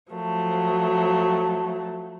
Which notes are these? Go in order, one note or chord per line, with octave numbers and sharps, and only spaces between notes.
F3 F#3 A3